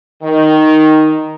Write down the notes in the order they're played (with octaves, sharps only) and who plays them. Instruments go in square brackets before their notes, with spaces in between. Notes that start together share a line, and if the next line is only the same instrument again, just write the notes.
[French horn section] D#3